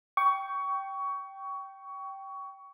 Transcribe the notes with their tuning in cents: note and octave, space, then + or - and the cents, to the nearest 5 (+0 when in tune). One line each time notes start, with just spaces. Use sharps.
G5 -10 C#6 +20